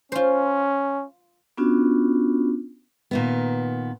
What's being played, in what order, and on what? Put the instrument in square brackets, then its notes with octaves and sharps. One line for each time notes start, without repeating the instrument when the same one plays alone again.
[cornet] C#4 [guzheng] F4 C5
[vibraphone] B3 C#4 D4 F4 F#4
[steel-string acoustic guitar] A#2 D#3 B3